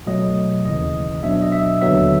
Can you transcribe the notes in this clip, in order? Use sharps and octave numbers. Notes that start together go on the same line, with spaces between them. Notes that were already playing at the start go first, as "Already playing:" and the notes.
B2 F#3 A3 D#5
D#2 C#3 E3 D#5
B2 F#3 B3 D4 E5
D#5
E5
D#2 D3 F#3 B3 E5